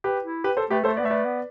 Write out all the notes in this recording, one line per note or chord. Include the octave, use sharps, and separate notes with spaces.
G4 B4
E4
G4 B4
A4 C5
A3 G4 B4
A3 A4 C5
B3 B4 D5
A3 E5
B4 D5
B3